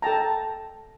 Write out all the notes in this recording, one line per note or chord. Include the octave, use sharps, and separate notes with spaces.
A4 G5 A5 A#5